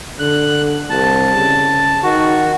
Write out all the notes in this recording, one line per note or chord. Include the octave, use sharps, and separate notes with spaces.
D3 F#6
C2 A5
C#3
D#3 F#4